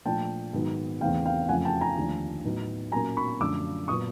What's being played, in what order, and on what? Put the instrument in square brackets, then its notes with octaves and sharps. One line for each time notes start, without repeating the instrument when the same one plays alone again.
[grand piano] A#2 F3 A3 D4 G5 A5
G#2 D#3 F#3 B3
E2 C#3 E3 A3 C4 F5 G5
F5 G5
F2 C#3 F3 A3 F#5 G#5
G5 A5
G#5 A#5
D#2 D3 F3 A3 D4
A2 F#3 B3 D#4
A#2 F#3 A#3 C#4 G#5 A#5
B5 C#6
F#2 D3 F3 A3 D6 E6
A#2 F#3 B3 C#6 D#6